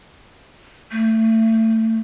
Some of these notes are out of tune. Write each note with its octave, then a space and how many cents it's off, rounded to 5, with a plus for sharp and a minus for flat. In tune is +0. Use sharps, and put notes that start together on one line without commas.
A3 +25